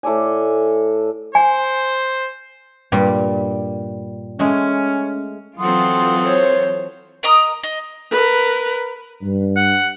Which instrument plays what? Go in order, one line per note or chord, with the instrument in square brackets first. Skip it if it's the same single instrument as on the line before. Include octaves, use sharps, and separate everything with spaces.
[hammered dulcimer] A2 A4 D5 G#5
[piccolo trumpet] C5 [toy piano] G#5
[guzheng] G2 A#2 G3
[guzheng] G#3 A3 [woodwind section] C#4
[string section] E3 F#3 F4 [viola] C4 A4 [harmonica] F#5 C6 D#6
[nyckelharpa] C5 C#5
[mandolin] A#4 D#5 A#5 D#6
D#5
[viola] A#4 B4
[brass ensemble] G2
[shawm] F#5